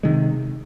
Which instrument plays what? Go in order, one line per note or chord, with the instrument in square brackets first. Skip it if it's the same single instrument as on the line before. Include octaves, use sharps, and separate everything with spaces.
[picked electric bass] C3 D#3 G#3